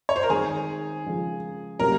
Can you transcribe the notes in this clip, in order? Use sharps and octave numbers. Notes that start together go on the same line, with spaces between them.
C#5
C5
A#4
D#3 G#3 C4 D#4 G#4
C#3 F3 G#3
C3 F#3 A#3 C#4 A#4